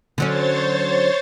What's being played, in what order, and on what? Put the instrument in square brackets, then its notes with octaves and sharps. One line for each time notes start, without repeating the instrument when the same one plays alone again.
[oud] D3 F#3 C#4 [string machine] C5 C#5 A6